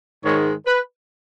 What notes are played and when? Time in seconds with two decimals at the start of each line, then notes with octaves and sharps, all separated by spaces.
0.24 G#2 D#3 G#3 C#5
0.66 B4